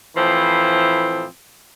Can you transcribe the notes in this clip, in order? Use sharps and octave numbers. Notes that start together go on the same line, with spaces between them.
A2 E3 F3 C4